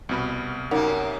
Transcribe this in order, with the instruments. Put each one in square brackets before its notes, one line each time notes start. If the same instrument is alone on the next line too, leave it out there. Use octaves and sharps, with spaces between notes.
[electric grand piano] C2 B2 B5
[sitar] F#2 C3 A#3 [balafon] D#4 A#4 F#5